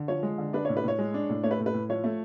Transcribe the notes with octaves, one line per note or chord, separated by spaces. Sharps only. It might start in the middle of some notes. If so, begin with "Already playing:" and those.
Already playing: D3
F3 C#5
G#3
D3
D4 B4
C#5
A2
B4
A2 C#5
G#3
D4
A2
A3 C#5
B4
A2
B4
A2
F3 C#5
A3